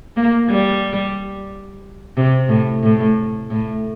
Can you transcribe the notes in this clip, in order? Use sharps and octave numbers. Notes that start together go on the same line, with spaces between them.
A#3
G3
C3
A2
A2
A2